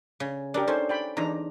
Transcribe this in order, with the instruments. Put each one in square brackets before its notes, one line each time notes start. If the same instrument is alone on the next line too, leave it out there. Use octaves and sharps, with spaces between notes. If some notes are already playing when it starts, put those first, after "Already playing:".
[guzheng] C#3
[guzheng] D4 [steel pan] G4 A#4 D5
[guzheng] C#4 [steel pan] D#4 A4 C5
[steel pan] D5 G5 B5
[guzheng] E2 [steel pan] D4 D#4 A#5